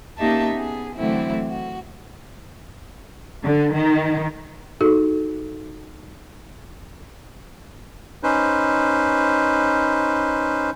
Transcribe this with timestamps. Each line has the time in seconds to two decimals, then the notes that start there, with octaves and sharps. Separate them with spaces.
0.18 A#3 C#4 D#4 G4 E5 A5
0.54 B3 G#4
0.96 D3 E3 F#3 A3 C4 E4
1.47 F#4
3.43 D3
3.75 D#3
4.81 D#4 F#4 G#4 A4
8.23 C#4 D#4 B4 C5